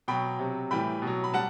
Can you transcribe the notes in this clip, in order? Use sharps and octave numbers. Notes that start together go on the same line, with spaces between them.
B2 F#3 G5 B5
C3 F#3
A2 E3 G3 G5 B5
B2 F#3
B5
G3 F#5 A5